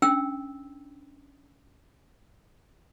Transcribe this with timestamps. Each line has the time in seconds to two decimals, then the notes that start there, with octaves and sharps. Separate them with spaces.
0.02 C#4 D4 G5 E6